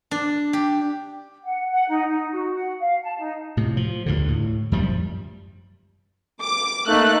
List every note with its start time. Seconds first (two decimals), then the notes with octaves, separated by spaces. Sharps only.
0.11 D4
0.53 G4
1.43 F#5
1.70 F#5
1.89 D#4
2.07 D#4
2.32 F#4
2.55 F#5
2.80 F5
3.02 A5
3.17 D#4
3.57 A2 C3
3.77 F3
4.06 D2 G2 D3
4.28 A2
4.72 F#2 F3 G3
6.43 D6
6.88 A3 A#3 D#4 F#6